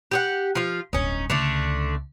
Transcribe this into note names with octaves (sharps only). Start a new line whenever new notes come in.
G4 G#4 F#5
F3 F4
D1 G1 C#4 D#4
C#2 D3 A3 D4